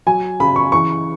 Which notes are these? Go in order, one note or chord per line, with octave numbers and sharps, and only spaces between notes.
F#3 G#5
C#3 B5
C#6
E3 C#6